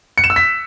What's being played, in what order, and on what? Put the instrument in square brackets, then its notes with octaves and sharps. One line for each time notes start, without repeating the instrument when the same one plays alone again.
[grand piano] C#7
E7
E6
B6